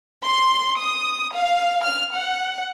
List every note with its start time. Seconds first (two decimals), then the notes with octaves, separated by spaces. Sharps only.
0.24 C6
0.79 D#6
1.35 F5
1.84 F6
2.15 F#5